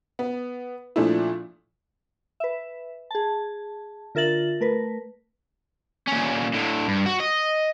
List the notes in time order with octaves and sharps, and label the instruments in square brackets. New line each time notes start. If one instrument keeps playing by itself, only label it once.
[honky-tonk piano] B3
A#2 F3 A3 D4 E4
[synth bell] B4 E5
G#4 A5
D3 F4 A#4 E5 A6 F#7
A3 A#4 B4
[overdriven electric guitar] A#2 C#4
A2 D3
G2
F#4
D#5